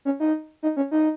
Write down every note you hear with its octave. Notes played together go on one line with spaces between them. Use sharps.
C#4
D#4
D#4
C#4
D#4